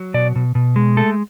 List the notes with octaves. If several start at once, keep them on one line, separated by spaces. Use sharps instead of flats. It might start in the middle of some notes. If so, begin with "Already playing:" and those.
Already playing: F#3
B2 D5
B2
B2
G#3
A3 A4